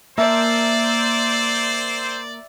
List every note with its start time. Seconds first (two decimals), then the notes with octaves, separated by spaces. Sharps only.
0.18 A#3 C4 A#4 C5 D5 E5 A5